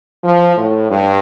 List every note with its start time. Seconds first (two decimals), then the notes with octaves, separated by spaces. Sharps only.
0.24 F3
0.57 A2
0.90 G2